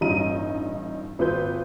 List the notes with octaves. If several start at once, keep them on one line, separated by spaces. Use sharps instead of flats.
A1 G2 A#2 D#4 A#5 D#7
G#1 A#2 F3 B4 C5 G6